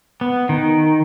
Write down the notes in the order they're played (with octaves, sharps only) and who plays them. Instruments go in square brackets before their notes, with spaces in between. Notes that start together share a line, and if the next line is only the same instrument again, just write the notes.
[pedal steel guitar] B3
D#3